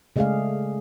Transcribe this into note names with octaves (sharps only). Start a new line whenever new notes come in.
C#3 G#3 A3 G#4 D5 F5